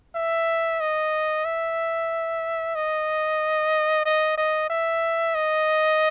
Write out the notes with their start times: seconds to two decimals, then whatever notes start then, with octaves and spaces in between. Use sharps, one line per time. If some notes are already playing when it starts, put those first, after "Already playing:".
0.15 E5
0.80 D#5
1.45 E5
2.75 D#5
4.06 D#5
4.38 D#5
4.70 E5
5.35 D#5